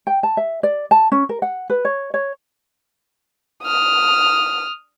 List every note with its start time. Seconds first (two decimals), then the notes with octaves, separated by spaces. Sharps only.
0.07 G5
0.23 A5
0.37 E5
0.63 D5
0.91 A5
1.12 C#4
1.29 A#4
1.42 F#5
1.70 B4
1.85 C#5
2.14 C#5
3.64 D#6 F6